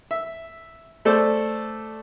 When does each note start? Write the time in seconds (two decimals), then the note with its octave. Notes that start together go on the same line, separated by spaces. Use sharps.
0.11 E5
1.05 A3 A4 C5 D5